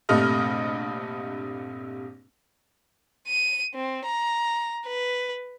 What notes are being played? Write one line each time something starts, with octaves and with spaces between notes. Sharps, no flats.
A#1 G2 C3 A3 D#5 F6
D#7
C4
A#5
B4